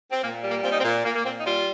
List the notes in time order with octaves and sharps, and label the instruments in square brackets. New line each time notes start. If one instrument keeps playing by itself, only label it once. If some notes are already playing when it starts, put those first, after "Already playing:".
[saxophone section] C4
A#2 A#3
G3
A#3
A#2 C4
D#4
C4
A#2
A#2 A#3
A#3
A#2 C4
D#4
G3 F4